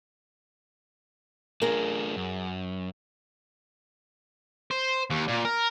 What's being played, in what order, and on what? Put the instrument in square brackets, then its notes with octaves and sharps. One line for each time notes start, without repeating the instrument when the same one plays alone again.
[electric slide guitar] A3 D4 F4 [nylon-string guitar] G#4 A#4
[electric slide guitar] F#2
[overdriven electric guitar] C5
D#2
A#2
A#4